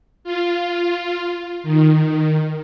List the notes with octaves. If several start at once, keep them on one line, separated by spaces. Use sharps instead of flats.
F4
D#3